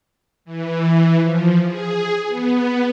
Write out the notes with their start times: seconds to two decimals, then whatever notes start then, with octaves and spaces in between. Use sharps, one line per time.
0.45 E3
1.21 F3
1.66 G#4
2.27 B3